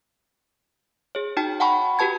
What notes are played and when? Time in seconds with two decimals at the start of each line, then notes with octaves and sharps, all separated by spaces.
1.15 G#4 C#5
1.37 D#4 F#4 G5 A5
1.60 F#5 G5 A5 B5 C#6
1.99 F#4 G4 B4 A5 G#6